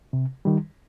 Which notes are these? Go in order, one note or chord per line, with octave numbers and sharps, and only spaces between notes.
C3
D#3 G3